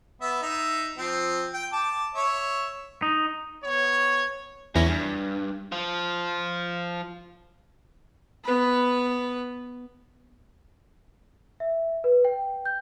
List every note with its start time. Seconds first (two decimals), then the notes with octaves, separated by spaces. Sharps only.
0.21 B3 E5
0.42 D#4 E5
0.98 F3 C4
1.53 G5
1.73 A5 D6
2.15 C#5 E5
3.02 D#4
3.63 B3 C#5
4.76 E2 C#4 E4 A#6
4.87 G2
5.72 F3 F4
8.44 B3 B4
11.60 E5
12.04 B4
12.25 G5
12.65 G6